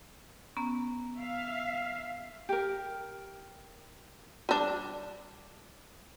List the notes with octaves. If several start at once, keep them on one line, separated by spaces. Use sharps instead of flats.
B3 C#4 A#5
E5 F5
G4 A#4
G3 D4